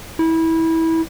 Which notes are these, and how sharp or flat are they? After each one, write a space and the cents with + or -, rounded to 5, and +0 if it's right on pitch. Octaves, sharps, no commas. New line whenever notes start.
E4 -20